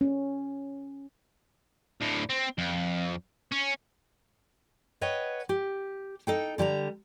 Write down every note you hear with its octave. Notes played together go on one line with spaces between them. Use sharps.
C#4
D2 A2
C4
F2
C#4
B4 C#5 D#5 F#5 G5
G4
D#4 A4 G5
D3 G3 A5 A#5